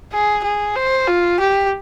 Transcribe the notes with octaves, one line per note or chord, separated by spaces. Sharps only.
G#4
G#4
C5
F4
G4